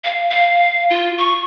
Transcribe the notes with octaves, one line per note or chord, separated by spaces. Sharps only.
F5
F5
F4
C#6